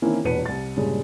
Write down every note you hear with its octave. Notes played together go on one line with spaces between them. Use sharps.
D#3 E3 A#3 C4 C#4 E4
E1 E2 A#2 B4 C#7 D#7
C2 A6
G2 A#2 C#3 G#3